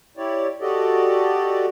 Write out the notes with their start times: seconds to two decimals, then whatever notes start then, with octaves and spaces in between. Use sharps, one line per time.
0.17 E4 G4 C#5 D5
0.61 F#4 G4 A4 D5 D#5